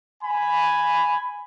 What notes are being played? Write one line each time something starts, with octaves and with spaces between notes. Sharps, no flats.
G#5 B5